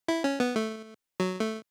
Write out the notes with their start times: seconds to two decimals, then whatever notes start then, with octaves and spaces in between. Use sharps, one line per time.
0.08 E4
0.24 C#4
0.40 B3
0.56 A3
1.20 F#3
1.40 A3